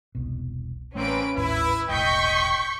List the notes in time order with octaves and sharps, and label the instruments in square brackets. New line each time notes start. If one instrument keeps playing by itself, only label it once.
[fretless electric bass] E1 C2 B2
[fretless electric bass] A1 A3 [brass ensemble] G3 A#3 C4 [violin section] C#4 B4 D7
[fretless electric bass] G#1 D#2 A2 [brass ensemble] E4 [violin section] B4
[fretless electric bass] E1 A#1 A2 [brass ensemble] D#5 G5 [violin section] C#6 G6 B6